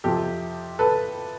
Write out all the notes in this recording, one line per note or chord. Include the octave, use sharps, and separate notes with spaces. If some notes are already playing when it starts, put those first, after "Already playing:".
F2 C3 F3 G4 A4
A4 B4